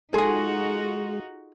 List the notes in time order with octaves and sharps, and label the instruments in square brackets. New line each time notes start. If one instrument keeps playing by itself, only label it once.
[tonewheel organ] G#3 [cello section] D#4 F4 F#4 [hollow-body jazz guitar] G#4 G#5 [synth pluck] A4 C6